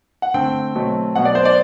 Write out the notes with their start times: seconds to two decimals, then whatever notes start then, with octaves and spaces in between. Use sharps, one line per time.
0.22 F#5
0.34 D3 A3 C4 G5
0.75 B2 F#3 A3 C4
1.15 B2 F#3 B3 F#5
1.25 D5
1.35 C5
1.45 D5